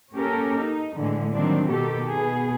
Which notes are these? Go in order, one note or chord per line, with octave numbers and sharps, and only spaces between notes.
A#3 C#4 G4 A4 A#4
D#4
A2 D3 E3 G#3
D#3 F#3 G3 A#3 C4 D4
B2 D#3 G4 A4
B2 B3 G#4